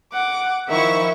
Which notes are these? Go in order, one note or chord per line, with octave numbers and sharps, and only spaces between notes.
F#5 D6
D#3 F3 E4 E5 C#6